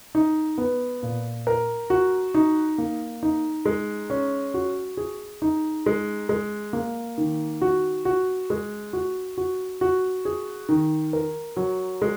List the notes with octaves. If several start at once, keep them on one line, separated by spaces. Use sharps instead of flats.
D#4
B3
A#2
A#4
F#4
D#4
A#3
D#4
G#3
C#4
F#4
G#4
D#4
G#3
G#3
A#3
D#3
F#4
F#4
G#3
F#4
F#4
F#4
G#4
D#3
A#4
F#3
G#3